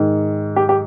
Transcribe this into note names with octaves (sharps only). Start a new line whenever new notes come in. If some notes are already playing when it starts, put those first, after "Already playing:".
Already playing: G#2 D#3
G4
G4